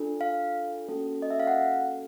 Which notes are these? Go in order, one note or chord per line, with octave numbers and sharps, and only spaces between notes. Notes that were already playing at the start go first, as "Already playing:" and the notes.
Already playing: D4 F4 A4
F5
A#3 C#4 F#4 A4
D#5
E5
F5
F#5